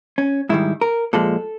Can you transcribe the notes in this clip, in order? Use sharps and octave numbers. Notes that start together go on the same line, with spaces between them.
C#4
G#2 D#3 G3 E4
A#4
A#2 F3 G#3 A4